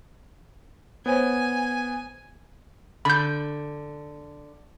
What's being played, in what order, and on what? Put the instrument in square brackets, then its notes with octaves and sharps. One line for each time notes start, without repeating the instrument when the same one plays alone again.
[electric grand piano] B3 [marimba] C5 C#5 [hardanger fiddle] G#5 [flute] G#6
[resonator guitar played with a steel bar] D3 [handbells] B5 G6